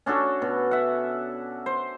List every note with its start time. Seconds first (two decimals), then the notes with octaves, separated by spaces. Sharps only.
0.06 C#4 D4 F#4 A4
0.42 B2
0.71 E5 F#5
1.66 C5